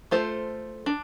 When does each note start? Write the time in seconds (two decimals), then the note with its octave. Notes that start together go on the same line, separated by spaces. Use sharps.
0.11 A3 F4 A4 C5
0.86 D4